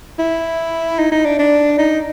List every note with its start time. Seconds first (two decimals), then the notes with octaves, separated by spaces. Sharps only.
0.19 E4
0.99 D#4
1.12 D#4
1.25 D4
1.39 D4
1.78 D#4